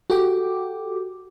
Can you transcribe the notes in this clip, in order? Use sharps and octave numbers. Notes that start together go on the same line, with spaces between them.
F#4 G4 A4 G5 D6